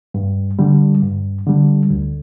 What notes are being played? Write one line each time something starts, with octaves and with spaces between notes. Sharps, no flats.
G2
D3 G3
G2
D3 G3
D2